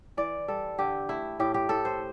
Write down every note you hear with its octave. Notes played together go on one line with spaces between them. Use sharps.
E3 D5
G3 A4
D3 G4
A3 E4
A2 G4
G4
A2 A4
C5